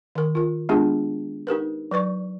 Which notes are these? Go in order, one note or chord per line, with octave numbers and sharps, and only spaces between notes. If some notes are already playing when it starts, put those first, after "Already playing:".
D#3 A#4
F4 A#4
G#3 B3 D4 F4 G4 G#4
D#4 G4 A#4 B4
F#3 B4 D5 C#6